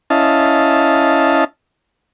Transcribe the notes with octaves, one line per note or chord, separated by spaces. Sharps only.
C#4 E4 D#5 F5 A5